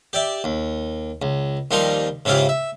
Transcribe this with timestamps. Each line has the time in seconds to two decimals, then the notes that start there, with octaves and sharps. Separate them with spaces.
0.13 G4 D5 E5
0.44 D#2
1.22 C#2
1.71 D#2 F3 G3 D#4 A#5 C6
2.25 G#2 C#3 E4 F4 G4
2.49 E5